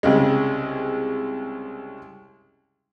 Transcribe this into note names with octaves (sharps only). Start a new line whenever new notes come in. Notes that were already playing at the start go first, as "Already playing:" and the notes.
C2 C#3 G#3